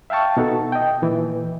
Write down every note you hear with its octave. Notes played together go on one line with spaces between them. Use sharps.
E5 F5 G5 A5 C#6
B2 D#4 F#4 A4
D#5 G5
A#2 E3